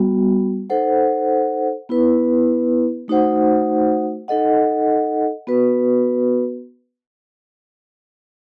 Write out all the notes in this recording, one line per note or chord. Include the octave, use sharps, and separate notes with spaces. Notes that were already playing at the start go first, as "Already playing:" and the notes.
Already playing: G3 B3 F#4
D#4 A4 C5 F#5
B3 E4 B4
A3 D#4 F#4 C5 F#5
D#4 A4 D#5 F#5
B3 F#4 B4